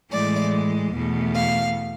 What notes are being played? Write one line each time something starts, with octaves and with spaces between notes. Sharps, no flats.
A2 E3 G#3 D5
E2 B2 A3
F5